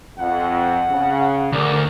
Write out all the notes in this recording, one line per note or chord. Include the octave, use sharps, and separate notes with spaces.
F2 F#5
C#3
D2 A#4 D5